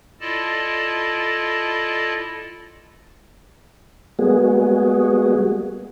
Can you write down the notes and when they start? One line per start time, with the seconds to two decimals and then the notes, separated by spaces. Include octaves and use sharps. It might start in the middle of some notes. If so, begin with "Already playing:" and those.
0.20 E4 F4 A4 D5 D#5 A5
4.19 G3 G#3 A#3 B3 F#4 G#4